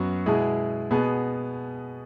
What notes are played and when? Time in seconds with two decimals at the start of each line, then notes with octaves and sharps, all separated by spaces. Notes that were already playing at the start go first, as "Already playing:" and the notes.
Already playing: F#2 F#3 B3 F#4
0.26 B2 G#3 E4 G#4
0.91 B2 B3 G#4